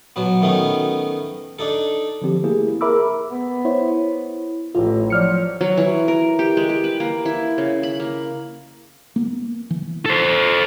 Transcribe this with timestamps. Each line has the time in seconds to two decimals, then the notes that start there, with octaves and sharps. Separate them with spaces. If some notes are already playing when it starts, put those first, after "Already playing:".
0.16 B2 F#3 B3
0.42 D#3 A3 B3 C#4 D#4
1.59 D4 D#4 A4
2.22 D3 F3 C4 G4
2.44 A3 A#3 E4 G4 G#4
2.81 G#4 A#4 E5 B5 D6 E6
3.30 B3
3.65 E4 C5 C#5
4.75 A1 F4
5.10 F3 F#3 D5 F6 C#7
5.61 F#3
5.78 E3
6.08 A#4
6.39 G4
6.57 G#3
6.69 G4
6.84 B4
7.00 A#3
7.26 E4
7.58 C#3
7.83 B5
8.00 A#3
9.16 A#3 B3
9.70 E3
10.06 A4 C5